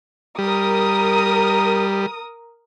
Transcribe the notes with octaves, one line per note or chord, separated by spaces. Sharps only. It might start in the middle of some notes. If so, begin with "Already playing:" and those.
G3 A#4 D#6